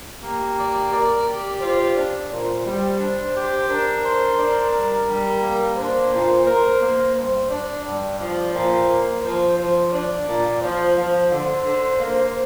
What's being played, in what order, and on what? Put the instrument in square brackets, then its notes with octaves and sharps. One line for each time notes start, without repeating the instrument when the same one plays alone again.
[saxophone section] A#3 [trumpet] G4
[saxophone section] D5
[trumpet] A#4 [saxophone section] D5
[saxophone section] G4
[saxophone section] F4 [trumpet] C5
[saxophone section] D4 [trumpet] D5
[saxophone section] A#2 [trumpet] C5
[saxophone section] G3
D4
G4
[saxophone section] D4 [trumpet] A#4
[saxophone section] C5
D4
G3
G3
A#3
[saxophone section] D4 [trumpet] C5
[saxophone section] A#2
[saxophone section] A#4 [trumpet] C5
[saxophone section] A#3
[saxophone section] G2 [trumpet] C5
[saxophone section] D4 [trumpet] D5
[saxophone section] G2 [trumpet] D5
[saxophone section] F3 [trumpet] D5
[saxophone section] A#2 [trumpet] C5
[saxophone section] A#3
[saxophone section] F3 [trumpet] C5
[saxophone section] F3 [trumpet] C5
[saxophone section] D4 [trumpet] D5
[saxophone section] A#2
[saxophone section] F3 [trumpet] C5
[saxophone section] F3 [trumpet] C5
[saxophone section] D3
D3
A#3